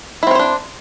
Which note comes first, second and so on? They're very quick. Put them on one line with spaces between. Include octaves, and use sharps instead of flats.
E4 C4 C#5 C5 D4